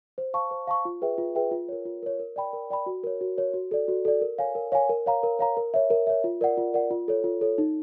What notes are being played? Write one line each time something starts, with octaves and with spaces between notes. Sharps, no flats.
C5
F5 A5 C#6
C5
F5 A5 C#6
F4
G#4 B4 E5 G5
F4
G#4 B4 E5 G5
F4
A#4 C#5
F4
A#4 C#5
A#4
D5 G5 B5
A#4
D5 G5 B5
F#4
A#4 C#5
F#4
A#4 C#5
F#4
A4 D5
F#4
A4 D5
A#4
C#5 F5 G#5
A#4
C#5 F5 G#5
A#4
C#5 F5 A#5
A#4
C#5 F5 A#5
A#4
C#5 E5
A#4
C#5 E5
F4
A#4 D5 F#5
F4
A#4 D5 F#5
F4
A4 C#5
F4
A4 C#5
D#4